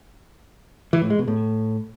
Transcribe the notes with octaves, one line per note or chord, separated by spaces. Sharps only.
E3
A2
G#3
B2
A2